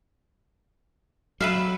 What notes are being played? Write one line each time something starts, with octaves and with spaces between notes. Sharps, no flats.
F#3 B4 E5 F5